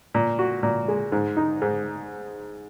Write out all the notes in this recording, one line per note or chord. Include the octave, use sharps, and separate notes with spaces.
A#2
F#4
A#2
G#3
G#2
D#4
G#2